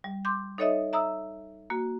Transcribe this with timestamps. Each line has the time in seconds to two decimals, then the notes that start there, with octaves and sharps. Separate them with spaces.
0.04 G3
0.25 C6 D6 G6
0.58 D#4 A4 C#5 D#5 E5 D#6
0.93 E5 A#5 D#6 E6
1.70 A#3 F#4